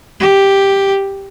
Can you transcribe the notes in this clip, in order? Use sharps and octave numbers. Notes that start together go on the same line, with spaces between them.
G4